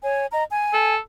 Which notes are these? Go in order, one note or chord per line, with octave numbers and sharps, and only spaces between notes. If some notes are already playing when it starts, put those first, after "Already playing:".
C#5 G#5
D#5 A#5
G#5
A4